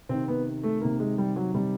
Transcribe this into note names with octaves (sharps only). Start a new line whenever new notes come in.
C3 D#3 C4
B3
A3
C3 D#3 A#3
G#3
G3
F#3
C3 D#3 G3